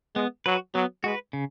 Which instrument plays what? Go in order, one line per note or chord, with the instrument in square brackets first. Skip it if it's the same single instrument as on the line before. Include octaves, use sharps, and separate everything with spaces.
[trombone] G#3 [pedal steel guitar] B3
[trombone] F#3 [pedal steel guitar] F#4 B4
[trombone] F#3 [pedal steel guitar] B3
[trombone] G#3 [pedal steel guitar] F#4
[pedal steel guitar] B4
C#3